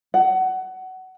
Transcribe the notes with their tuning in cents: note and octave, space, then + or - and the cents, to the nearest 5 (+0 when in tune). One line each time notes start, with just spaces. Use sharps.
F#5 +20